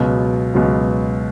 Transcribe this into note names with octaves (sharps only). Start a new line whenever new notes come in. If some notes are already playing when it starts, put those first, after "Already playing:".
Already playing: C#2 B2 F#3 B3
C#2 B2 F#3 B3